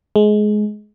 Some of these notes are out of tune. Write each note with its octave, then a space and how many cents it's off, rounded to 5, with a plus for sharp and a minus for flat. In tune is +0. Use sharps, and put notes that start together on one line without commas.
G#3 +20